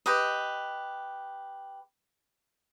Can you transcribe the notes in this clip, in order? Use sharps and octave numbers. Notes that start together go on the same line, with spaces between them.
G4 B4 D#5